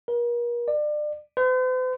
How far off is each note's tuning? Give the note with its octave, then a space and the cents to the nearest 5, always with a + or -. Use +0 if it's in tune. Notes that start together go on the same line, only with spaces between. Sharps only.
A#4 +40
D5 +30
C5 -45